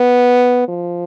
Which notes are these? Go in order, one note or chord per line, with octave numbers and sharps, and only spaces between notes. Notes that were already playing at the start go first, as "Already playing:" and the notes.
Already playing: B3
F3